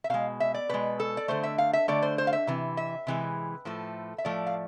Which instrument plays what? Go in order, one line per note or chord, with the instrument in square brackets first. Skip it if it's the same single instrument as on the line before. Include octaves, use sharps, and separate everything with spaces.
[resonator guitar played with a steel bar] E5
B2 G#3 F5
E5
D5
B2 G#3 B4
A4
D5
D3 A3 C5
E5
F5
E5
D3 A3 D5
C5
C5
F5
E5
C3 E3
E5
C3 E3 G#3
A2 F3 A3
E5
A2 F3 A3 D5
F5